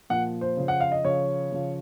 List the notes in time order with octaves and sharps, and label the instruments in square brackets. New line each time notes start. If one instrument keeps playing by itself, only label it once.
[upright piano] A#2 F3 F#5
C5
C#3 F3
F#5
F5
D#5
C#3 F3 C#5
C#3 F3